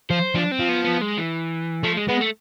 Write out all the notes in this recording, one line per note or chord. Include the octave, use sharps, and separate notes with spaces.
F3 C5
F3 D4
C4
F3
B3
B3
G#3
E3
F3 A3
G#3
G#3 B3
A3